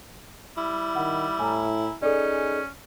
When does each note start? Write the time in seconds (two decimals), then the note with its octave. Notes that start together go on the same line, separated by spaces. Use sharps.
0.57 G3 E4
0.96 D#3 F#5
1.39 A2 G#5 A#5
2.02 C#4 D#4 G#4 A4 D5